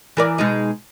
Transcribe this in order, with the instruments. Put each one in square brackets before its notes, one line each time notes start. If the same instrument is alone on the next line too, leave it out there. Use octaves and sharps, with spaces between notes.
[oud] E3 A#4 D5
B2 G#3 D#4